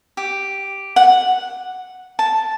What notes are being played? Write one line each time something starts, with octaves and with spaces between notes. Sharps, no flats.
G4
F#5
A5